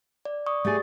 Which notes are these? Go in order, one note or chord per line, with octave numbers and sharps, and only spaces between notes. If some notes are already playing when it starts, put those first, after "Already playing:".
D5
D5 C#6 D#6
A3 G4 G#4 D5 A6